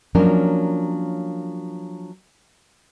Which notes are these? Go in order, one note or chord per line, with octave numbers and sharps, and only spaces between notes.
F3 F#3 A#3 C#4 D4 A#4